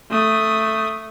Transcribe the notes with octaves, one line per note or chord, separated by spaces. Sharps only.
A3 D#6